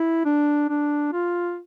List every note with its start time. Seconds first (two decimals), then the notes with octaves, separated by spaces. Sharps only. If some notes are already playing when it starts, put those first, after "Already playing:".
Already playing: E4
0.25 D4
0.70 D4
1.13 F4